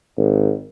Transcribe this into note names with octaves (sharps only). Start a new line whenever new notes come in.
G#1